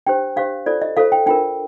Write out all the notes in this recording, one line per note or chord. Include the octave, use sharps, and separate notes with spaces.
D4 G4 C5 G5
D4 G4 C5 F5
F4 A4 C5 D5
D#5
F4 A4 C5 F5
G5
D4 F4 A#4 G5